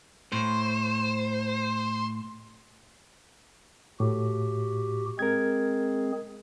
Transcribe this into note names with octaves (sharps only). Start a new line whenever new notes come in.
A2 C5
A2 F#4 G4
G#3 C4 G#4 A#4 G#6